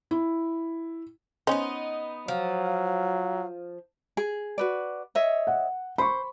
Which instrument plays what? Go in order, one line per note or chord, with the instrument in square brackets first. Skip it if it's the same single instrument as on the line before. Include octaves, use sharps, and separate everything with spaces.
[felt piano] E4
[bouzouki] B3 D#4 [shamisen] C#4 C5
[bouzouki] F3 [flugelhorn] F#3 [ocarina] F5
[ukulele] G#4
F#4 B4 D5
C#5 D#5 E5
[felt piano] F#5
[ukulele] C5 [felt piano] B5 C#6